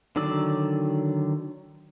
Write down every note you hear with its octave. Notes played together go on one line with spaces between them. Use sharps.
D3 D#3 F#3 D5 E6